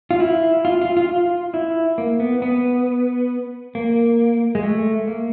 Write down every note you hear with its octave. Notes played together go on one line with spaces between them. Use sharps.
F4
E4
F4
F4
F4
F4
E4
A#3
B3
B3
A#3
G#3
A3
A#3